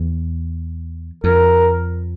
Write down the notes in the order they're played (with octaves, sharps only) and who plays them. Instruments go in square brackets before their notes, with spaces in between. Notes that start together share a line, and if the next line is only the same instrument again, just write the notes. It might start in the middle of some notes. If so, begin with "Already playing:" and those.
Already playing: [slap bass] E2
[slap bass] F2 [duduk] A#4